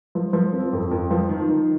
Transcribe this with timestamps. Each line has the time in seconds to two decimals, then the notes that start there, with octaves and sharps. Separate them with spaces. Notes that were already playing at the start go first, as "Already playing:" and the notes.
0.15 F3
0.33 F3
0.53 C4
0.73 F2
0.91 F2
1.11 F3
1.29 D#3
1.49 D#3